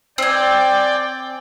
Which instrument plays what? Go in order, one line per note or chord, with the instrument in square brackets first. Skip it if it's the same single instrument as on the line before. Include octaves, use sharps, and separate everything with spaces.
[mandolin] C4 G#5 [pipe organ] D5 G5